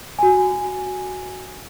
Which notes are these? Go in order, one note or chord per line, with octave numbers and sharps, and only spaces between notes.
F#4 G#5